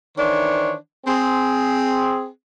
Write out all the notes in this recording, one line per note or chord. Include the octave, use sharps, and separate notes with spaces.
D#3 E3 D4 C5 C#5
C4 G#4